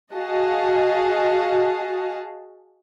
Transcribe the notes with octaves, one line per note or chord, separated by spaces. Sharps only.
F#4 G#4 D#5 F5 A5